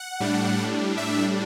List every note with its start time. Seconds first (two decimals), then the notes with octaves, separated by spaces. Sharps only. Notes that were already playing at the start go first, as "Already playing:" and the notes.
Already playing: F#5
0.20 A2 G3 D4
0.97 E5